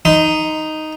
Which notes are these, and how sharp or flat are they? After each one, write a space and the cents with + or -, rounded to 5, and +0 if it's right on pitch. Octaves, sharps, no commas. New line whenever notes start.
D#4 +0 C6 -45